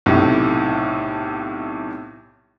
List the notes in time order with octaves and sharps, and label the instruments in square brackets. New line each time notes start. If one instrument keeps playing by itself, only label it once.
[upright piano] B1 A2 C3